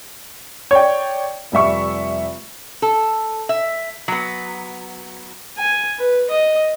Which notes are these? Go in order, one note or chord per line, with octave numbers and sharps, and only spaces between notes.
C#5 D5 G5
F1 G3 E5 C#6
A4
E5
F#3 B3
G#5
B4
D#5